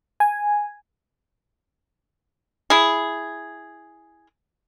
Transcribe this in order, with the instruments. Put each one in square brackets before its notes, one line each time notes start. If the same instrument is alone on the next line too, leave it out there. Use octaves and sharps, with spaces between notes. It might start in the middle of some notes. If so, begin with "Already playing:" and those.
[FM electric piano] G#5
[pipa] E4 G#4